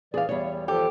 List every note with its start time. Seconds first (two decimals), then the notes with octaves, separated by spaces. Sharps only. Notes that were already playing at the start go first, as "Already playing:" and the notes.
0.14 E3 G#4 D5 F5
0.29 E2 G3 C#5
0.68 F3 G4 A4